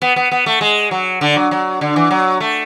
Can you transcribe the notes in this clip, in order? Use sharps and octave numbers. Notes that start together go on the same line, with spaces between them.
B3
B3
B3
A3
G#3
F#3
D3
F#3
F#3
D3
E3
F#3
A3